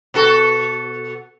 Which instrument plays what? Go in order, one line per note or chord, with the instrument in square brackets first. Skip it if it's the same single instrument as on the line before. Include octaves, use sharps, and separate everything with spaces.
[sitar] B2 F#4 A4